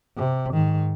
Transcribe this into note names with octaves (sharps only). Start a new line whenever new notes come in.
C3
G#2 D#3